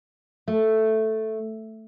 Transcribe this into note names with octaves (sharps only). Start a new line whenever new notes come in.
A3